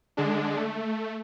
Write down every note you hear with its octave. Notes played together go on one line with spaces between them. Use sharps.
D3 G#3 D4
A3